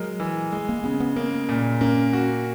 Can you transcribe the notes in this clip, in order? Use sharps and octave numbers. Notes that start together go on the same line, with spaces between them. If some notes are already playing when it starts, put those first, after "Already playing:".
Already playing: F#3 G#3 A#4
E3
G#3
A#3
C#3 B3
B3
A#3 C#4
A#2
A#3 C#4
F#4